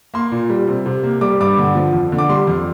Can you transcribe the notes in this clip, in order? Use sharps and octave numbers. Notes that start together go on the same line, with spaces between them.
A#3 C6
A#2
G3
C3
C3
A#3
G3 D6
G2 D6
D3
F3
F2
D3
D6
G3 C6
F2